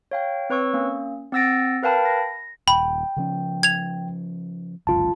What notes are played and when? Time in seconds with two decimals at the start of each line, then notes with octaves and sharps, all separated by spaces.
0.11 C#5 F5 G5
0.50 C4 B4 C#5 C#6 E6
0.74 A#3 C#4
1.32 C4 F#5 E6 A6 A#6 D7
1.83 A#4 B4 F5 G5 A5 B5
2.05 A#6
2.68 D#1 G5 B5
3.16 C#3 F3 C#4
3.63 G#6 F7
4.87 G1 C#2 F#2 F4 A5